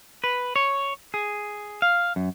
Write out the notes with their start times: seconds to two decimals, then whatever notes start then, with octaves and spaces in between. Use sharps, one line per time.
0.24 B4
0.56 C#5
1.14 G#4
1.82 F5
2.16 F#2